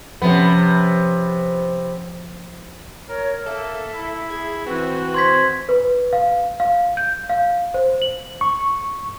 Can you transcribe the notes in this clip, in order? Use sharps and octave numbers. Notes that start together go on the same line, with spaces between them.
C3 F3 B3 C#4
A#4 C#5
A#3 A4 E5
E4
G#4 G#6
E3 C4 F#4 B4
C5 C6 G#6 B6
B4
F5
F5
G6
F5
C5
F#7
C#6